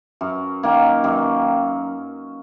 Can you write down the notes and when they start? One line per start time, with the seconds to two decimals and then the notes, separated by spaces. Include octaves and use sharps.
0.21 F#2
0.63 D#3 A#3
1.04 F#2